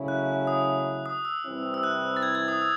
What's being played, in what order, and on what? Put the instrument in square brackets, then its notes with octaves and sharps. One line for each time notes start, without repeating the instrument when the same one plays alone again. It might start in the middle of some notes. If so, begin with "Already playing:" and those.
Already playing: [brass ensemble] C#3 F#3 A3 C#4 E4
[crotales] F#6
D#6
D#6
E6
[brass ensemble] C2 C3 E3 C4 E4
[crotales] E6
F#6
A6
G#6
G#6
D#6
E6